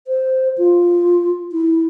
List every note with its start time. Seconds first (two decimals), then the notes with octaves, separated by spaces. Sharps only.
0.07 C5
0.58 F4
1.52 E4